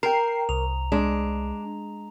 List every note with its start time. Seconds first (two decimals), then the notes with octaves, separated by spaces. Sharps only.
0.03 A#4 G5 A#5 C7
0.49 C2 F7
0.92 G#3 D4